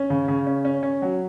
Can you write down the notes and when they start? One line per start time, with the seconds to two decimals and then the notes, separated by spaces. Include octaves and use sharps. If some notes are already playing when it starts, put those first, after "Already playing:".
Already playing: C#4
0.10 C#3
0.28 C#3
0.47 C#4
0.65 C#4
0.83 C#4
1.02 F#3